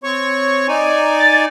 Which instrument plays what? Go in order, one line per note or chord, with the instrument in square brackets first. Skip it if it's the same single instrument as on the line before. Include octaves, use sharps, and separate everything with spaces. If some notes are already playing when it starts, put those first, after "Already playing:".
[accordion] C4 C#5 C#6
D#4 D5 G#5
[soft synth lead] A6